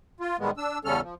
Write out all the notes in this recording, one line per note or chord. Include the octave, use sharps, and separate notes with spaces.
F4
A2 D#3 G3 G#3 B3
D4 E6
E2 C#3 G3 C#4 A4 F6
F3